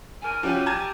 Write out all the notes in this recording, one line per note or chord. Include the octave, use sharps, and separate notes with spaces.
E2 A#4 G#5
F3 G3 C#4 F#4 G4
A5 A#5 G#6